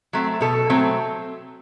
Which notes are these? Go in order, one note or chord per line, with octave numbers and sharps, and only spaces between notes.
F#3 A3 C4
B2 A4
F#3 A3 C4